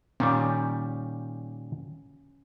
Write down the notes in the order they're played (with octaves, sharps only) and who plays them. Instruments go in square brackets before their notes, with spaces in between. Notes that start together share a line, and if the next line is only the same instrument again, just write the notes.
[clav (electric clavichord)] A#2 D#3 G3 [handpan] C#4